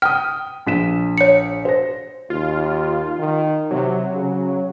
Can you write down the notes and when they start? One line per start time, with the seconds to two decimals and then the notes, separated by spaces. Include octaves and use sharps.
0.02 G5 D#6 F6
0.66 A#1 B6 E7
1.18 C#5 C#7
1.65 C5 A#6
2.30 D#2 F4
3.19 D#3
3.71 C3 F#3
4.14 C#3